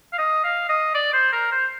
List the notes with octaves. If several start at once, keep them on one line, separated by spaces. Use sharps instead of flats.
F5
D#5
F5
D#5
D5
C5
A#4
C5